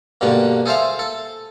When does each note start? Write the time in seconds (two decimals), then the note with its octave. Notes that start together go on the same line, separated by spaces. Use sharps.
0.21 G2 B2 D3 A#3 D4
0.66 G#4 A4 C5 E5 F5
0.99 A4